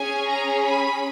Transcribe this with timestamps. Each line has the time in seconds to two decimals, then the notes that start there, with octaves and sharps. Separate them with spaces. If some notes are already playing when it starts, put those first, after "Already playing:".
Already playing: C#4 G#4 G#5
0.28 A#5
0.66 B5